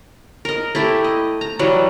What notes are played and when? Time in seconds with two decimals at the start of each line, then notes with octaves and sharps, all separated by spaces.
0.45 A#4 D#5
0.75 A3 E4 G4
1.04 D#5
1.41 A#5
1.59 E3 F#3 G3 F#4